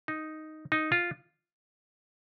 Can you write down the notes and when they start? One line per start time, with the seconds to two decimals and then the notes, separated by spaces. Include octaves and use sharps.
0.08 D#4
0.72 D#4
0.92 F4